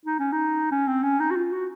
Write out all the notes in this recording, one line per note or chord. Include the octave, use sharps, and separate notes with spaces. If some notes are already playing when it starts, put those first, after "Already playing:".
D#4
C#4
D#4
C#4
C4
C#4
D#4
F#4
F4
F#4